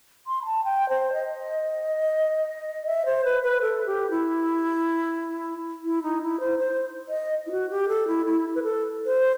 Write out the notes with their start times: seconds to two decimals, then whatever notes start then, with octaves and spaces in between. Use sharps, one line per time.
0.27 C6
0.42 B5
0.45 A5
0.64 G5
0.89 C5
1.13 D#5
2.86 E5
3.06 C5
3.25 B4
3.43 B4
3.62 A4
3.86 G4
4.11 E4
5.84 E4
6.03 D#4
6.22 E4
6.40 C5
6.59 C5
7.09 D#5
7.46 E4
7.51 F#4
7.70 G4
7.88 A4
8.08 E4
8.26 E4
8.55 B4
8.63 A4
9.06 C5